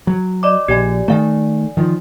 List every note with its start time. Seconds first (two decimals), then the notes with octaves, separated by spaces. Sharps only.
0.07 F#3
0.43 D5 D#5 D6
0.68 A#1 G4 D5 G#5
1.08 D#3 A3 D5 F5 G#5
1.77 D#3 F3